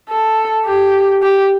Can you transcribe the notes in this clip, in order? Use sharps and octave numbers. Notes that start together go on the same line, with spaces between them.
A4
G4
G4